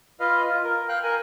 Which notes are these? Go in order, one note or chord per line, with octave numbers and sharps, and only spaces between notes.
F4 B4 D#5 F5
F4
A#4
F5 G5 F#6
A#4 G#5